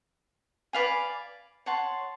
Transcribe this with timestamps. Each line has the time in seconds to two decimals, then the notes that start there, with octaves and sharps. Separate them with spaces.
0.73 B4 D5 F5 G#5
1.66 C#5 F#5 A5 C6